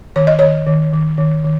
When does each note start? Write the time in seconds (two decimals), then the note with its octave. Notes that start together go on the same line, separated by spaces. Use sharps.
0.16 D#3 C#5
0.27 D#5
0.39 D#3 C#5
0.67 D#3
0.93 D#3
1.18 D#3
1.44 D#3